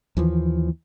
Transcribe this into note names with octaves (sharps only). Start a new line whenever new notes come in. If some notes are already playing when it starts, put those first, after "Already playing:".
D#2 E3 F3